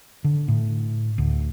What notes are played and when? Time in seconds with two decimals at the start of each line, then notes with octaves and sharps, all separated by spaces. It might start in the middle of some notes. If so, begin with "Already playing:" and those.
0.24 D3
0.48 A2
1.18 D2